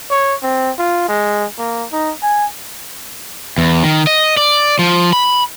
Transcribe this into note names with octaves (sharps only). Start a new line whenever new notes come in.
C#5
C4
F4
G#3
A#3
D#4
G#5
E2
D#3
D#5
D5
F3
B5